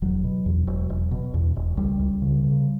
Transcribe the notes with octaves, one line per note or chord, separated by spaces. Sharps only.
E1 F#3
B2
E2
E1
E1
B2
E2
E1
C#2 G3
C#2
C#3
C#3